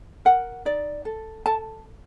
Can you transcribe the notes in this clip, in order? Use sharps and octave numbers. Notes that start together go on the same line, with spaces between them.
A#4 F#5
D#4 D5
A4
A4 A5